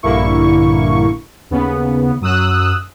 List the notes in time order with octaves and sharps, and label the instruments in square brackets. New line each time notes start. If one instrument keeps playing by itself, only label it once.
[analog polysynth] A#1 G2 D3 A#3 E4 C#6
D#2 C#3 B3
F#2 F#3 D#6 E6 F#6